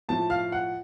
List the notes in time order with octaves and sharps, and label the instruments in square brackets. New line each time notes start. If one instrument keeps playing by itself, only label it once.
[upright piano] A2 F3 A5
F5
F#5